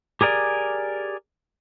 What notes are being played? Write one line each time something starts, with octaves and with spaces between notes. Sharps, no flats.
G4 G#4 A#4 D5 G#5